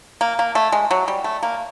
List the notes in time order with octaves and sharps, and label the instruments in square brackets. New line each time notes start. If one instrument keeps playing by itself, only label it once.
[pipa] A#3
A#3
A3
G#3
F#3
G3
A3
A#3